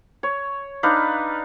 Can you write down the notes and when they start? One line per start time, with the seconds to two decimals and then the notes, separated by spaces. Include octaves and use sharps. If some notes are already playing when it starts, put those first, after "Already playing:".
0.23 C#5
0.83 D4 D#4 B4 F5